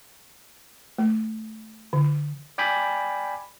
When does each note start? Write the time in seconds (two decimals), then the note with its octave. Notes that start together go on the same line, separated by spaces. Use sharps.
0.98 A3
1.93 D3
2.58 D5 G5 G#5 B5